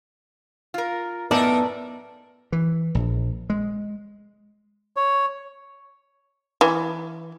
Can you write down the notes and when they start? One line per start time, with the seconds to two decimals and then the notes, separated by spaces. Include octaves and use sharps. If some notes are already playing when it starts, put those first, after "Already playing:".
0.74 F4 A#4
1.31 F#2 A2 B3 D#4 A#4 D5 E5 A5
2.52 E3
2.95 A#1
3.50 G#3
4.97 C#5
6.61 E3